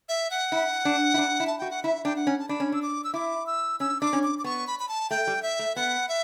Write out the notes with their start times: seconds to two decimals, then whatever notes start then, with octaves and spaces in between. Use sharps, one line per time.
0.09 E5
0.31 F#5
0.52 E4
0.85 D4
1.14 E4
1.18 D4
1.40 E4
1.47 A5
1.58 F#4 G5
1.71 F#5
1.83 E4 E5
2.05 D4 G5
2.16 F#5
2.27 C#4
2.39 A5
2.49 D4 B5
2.60 C#4
2.72 D4 E6
2.82 D6
3.04 E6
3.14 E4 D6
3.46 E6
3.80 C#4 E6
4.01 D4 D6
4.13 C#4
4.23 D6
4.39 D6
4.44 B3 C#6
4.67 B5
4.79 B5
4.89 A5
5.10 A3 G5
5.27 G3
5.43 E5
5.59 A3
5.76 B3 F#5
6.08 E5